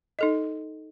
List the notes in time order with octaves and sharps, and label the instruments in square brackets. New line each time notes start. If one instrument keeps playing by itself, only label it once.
[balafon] D#4 A4 D#5